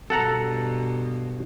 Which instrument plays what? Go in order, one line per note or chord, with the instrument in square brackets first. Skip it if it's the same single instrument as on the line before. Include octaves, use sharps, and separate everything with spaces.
[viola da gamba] G2 B2 [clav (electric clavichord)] A4 F#5 A#5